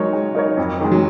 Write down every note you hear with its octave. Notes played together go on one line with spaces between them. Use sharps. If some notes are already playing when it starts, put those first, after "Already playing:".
Already playing: F#3 G#3 D#4 A#4 C#5
G#3
D#4 A#4 C#5
F2
D#3 G#3
F#3